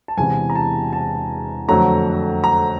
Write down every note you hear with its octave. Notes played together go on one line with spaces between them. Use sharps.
A5
E1 E2 C3 E3 G#5
A#5
A5
A5
F2 D3 F#3 A3 A#5
A#5